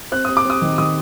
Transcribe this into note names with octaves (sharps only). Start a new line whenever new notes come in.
C4 F#6
C4 D#6
D6
C4 D#6
D#3
D#3 D#6